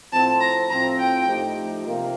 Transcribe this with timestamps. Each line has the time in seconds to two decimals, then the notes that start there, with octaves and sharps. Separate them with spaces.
0.12 A2 F3 C4 A5
0.40 A#5
0.70 A2 F3 C4 A#5
0.99 G5
1.28 F3 A3 D#4 G4
1.85 C3 F3 A#3